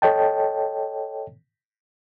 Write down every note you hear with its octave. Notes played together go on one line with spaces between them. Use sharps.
A4 C#5 D#5 G5 A5